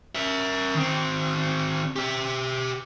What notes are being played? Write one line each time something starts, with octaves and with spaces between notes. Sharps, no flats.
A#4 E5
D#3 C4
G4 E5